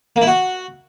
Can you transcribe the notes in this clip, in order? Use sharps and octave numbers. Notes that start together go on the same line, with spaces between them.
A#3
E4
F#4